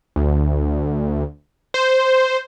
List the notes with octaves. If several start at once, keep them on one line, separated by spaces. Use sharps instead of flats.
D2
C5